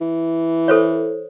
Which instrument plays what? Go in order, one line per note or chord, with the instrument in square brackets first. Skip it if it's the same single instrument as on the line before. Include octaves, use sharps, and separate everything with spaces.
[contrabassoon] E3
[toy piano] A4 C5 C#5